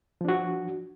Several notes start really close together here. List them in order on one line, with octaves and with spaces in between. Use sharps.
F3 D4 F#4